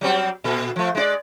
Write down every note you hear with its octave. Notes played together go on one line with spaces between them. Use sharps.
F#3 G3 C4
A#2 A4
F3 A3
G#3 E4 D5